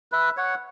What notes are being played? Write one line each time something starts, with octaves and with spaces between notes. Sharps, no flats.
B4 E5
C#5 F#5